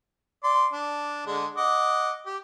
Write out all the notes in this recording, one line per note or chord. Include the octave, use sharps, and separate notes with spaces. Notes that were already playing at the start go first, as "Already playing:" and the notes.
D5 C6
D4
D3 G#3
D#5 F#5 D6
G4